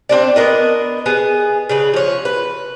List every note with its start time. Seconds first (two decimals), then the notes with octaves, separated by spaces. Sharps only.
0.09 C4 D4 D5
0.36 B3 D4 A#4 D#5
1.06 B3 G#4
1.69 C#3 D4 B4
1.94 F3 C#5
2.25 B4